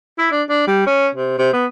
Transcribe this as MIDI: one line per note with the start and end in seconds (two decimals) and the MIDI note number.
0.19 0.28 64
0.32 0.43 62
0.49 0.67 62
0.67 0.83 55
0.87 1.08 61
1.15 1.34 48
1.38 1.51 48
1.53 1.66 59